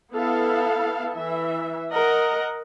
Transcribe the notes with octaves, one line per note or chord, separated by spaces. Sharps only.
B3 E4 A4 F5
E3 E5
A#4 D#5 F#5